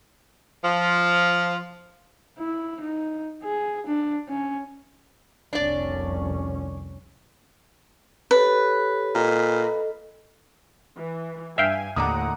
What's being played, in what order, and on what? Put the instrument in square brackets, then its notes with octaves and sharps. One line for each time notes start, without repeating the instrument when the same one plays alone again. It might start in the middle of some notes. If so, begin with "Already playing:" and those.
[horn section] F3
[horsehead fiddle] E4
D#4
G#4
D4
C#4
[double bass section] F1 C2 C#4 [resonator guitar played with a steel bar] D4 D5
[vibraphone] G4 A4 C#5 [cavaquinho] B4
[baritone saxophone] A#2 [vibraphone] A4 D#5
[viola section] E3
[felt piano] G2 [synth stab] E5 F5 G5 [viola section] G#5
[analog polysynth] D#2 A2 D3 [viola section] A3 F#5 [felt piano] A#5 D6 D#6